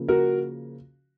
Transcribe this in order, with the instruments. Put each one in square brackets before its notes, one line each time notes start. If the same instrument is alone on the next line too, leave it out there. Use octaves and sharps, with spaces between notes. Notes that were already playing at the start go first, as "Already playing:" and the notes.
Already playing: [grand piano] C#3 F3 A#3
F#4 A#4